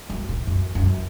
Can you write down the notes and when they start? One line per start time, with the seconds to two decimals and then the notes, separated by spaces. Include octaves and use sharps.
0.10 F#2
0.29 A2
0.47 F#2
0.75 F#2